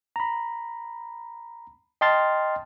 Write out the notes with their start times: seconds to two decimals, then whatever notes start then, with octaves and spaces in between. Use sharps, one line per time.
0.16 A#5 B5
2.01 D#5 G5 A5 C6 F6 A6